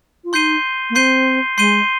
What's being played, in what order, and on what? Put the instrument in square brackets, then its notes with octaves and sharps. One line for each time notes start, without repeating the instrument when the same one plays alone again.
[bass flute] F4
[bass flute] D#4 [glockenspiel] C6 G6 C7 D#7 G7
[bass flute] A#3
[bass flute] C4 [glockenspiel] C6 G6 C7 D#7 G7
[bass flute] G#3 [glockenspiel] C6 G6 C7 D#7 G7